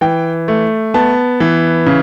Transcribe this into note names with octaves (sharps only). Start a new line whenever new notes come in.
E3 G5
A3
B3 A5
E3
C#3